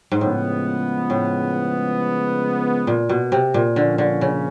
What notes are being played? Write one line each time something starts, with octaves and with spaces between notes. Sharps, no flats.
G#2
A2 C#3 F3 G#3 B3
A2
A#2
B2
C3
A#2
D3 F3 A#3 C#4
D3
C#3